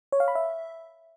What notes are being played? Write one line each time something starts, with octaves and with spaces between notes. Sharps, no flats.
C#5
F5
B5
E5